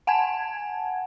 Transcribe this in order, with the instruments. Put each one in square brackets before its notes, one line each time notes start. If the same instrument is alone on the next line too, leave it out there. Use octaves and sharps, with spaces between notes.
[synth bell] F#5 G#5 A5 G#6